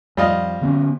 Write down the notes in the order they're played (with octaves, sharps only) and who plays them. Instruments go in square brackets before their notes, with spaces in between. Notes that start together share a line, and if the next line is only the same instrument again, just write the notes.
[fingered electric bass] F2 [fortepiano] G3 F4 D#5
[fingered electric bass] D3 B3 C#4